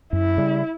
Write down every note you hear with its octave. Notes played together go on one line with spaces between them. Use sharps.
F#2 E4
C#3 G3